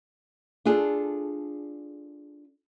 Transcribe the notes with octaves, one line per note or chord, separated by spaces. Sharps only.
D4 F4 G#4 A4